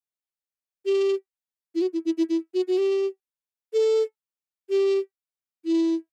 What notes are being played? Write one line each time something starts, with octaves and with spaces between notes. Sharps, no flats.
G4
E4
F#4
E4
E4
E4
E4
F#4
F#4
G4
A4
G4
E4